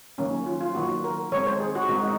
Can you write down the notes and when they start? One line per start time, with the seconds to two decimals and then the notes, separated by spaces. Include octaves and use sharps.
0.18 D#3 F#3 A#3 C#4
0.46 F4
0.61 F4
0.75 D#3 F#3 A#3 F#4
1.04 A#4
1.32 D#3 G#3 C4 C#5
1.47 C5
1.60 G#4
1.75 F#4
1.89 D#3 G#3 C4 D#4
2.03 D#4